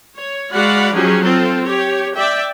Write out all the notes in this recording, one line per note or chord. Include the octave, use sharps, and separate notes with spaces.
C#5
G#3 F#4 D5 F5 F#5 B5
F3 F#3 C#4 D#4 G4 G#4
C4 F4 A4
G4 C#5
D5 E5 G5